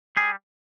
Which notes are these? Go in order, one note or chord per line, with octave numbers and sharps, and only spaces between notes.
G3 G#4